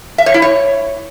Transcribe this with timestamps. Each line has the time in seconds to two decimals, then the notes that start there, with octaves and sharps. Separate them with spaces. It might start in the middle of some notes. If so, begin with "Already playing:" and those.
0.18 E5
0.26 C#5
0.34 E4
0.42 C#5